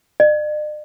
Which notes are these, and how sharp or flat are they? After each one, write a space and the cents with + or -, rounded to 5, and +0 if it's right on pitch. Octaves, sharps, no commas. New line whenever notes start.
D5 +45